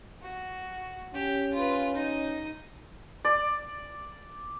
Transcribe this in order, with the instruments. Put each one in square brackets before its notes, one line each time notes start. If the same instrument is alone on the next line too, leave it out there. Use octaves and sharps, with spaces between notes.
[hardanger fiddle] F#4
[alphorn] C#4 [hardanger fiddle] G4
[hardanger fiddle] F4 B4
D#4 D#5
[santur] D5